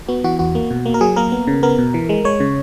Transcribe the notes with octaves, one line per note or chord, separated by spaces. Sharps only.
B3 F#4
E3 F#4
E2 F#4
A#3
B2
A#3
A#4
F#3 G#4
A#3 A#4
B3
C#3
B3 A#4
B2
E3
G#3
G#3 C#5
C#3